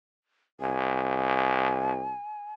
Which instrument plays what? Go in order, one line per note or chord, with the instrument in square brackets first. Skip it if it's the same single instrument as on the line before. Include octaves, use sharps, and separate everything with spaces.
[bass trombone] C2 [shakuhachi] G#5